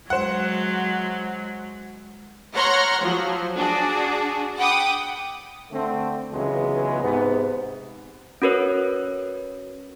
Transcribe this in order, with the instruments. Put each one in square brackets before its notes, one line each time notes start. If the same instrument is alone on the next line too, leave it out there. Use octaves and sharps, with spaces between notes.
[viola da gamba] F#3 G#3 [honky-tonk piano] C5 F#5
[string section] C#5 F#5 A#5 C6 F6
F3 F#3
D4 F#4 G#4
F#5 G5 B5 D6 D#6
[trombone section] D3 A3 C4
C#2 C#3 E3 F#3 G#3 B3
G#2 C3 B3
[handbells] C#4 F#4 A#4 B4 C#5